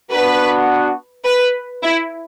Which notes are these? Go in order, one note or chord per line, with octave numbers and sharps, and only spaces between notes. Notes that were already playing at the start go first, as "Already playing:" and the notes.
B3 D4 F#4 B4
B4
E4